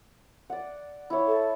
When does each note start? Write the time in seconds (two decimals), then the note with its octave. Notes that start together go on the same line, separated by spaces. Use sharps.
0.50 D5 F#5
1.10 E4 C#5
1.27 A4